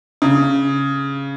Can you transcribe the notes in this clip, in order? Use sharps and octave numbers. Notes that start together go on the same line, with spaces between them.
C#3